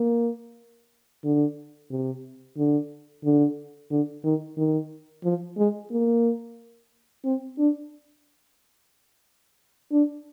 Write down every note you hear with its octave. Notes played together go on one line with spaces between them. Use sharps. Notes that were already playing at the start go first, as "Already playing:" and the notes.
Already playing: A#3
D3
C3
D3
D3
D3
D#3
D#3
F3
G#3
A#3
C4
D4
D4